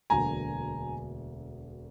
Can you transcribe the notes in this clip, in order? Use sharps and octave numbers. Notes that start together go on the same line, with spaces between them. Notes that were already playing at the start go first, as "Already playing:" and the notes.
E1 D2 D3 F#3 A#3 G#5 A#5